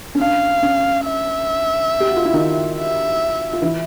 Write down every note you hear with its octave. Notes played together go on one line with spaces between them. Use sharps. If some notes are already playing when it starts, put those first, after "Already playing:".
C#4
D4 F5
C#4
E5
G4
F#4
F4
E4
D#3 D#4
E5
F4
E3 E4